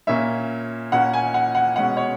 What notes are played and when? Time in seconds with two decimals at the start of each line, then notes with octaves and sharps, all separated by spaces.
0.07 A#2 A#3 C#4 E5
0.92 A#2 A#3 C#4 F#5
1.13 G#5
1.34 F#5
1.55 F#5
1.76 B2 G#3 C#4 F#5
1.97 C#5